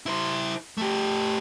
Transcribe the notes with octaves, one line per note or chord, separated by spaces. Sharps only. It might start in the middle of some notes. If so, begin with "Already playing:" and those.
E4 C5
A3 G4